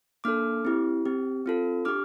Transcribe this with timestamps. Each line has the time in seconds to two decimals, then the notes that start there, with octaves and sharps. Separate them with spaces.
0.24 A#3 D4 A4 D6 F6
0.65 C4 E4 G4
1.05 C4 G4
1.46 C4 F4 A4
1.85 D4 G4 D6 F6